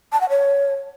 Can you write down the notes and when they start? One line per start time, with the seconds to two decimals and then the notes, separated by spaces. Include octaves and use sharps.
0.12 A5
0.21 F#5
0.29 C#5